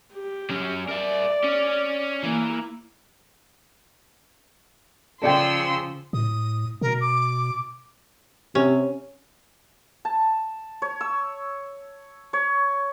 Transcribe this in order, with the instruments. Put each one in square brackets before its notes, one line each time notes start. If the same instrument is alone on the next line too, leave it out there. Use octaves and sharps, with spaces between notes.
[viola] G4
[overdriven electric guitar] F#3 C#4
[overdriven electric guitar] A#4 E5 [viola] D5
[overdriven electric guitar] C#4
[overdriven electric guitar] E3 [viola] A#3
[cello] C#3 F3 [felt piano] A4 D5 G5 [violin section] C6 E6
[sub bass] A2 [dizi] D#6
[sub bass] B2 [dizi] A#4
[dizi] D6
[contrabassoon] C3 [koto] C#4
[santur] A5
C#5
E6
C#5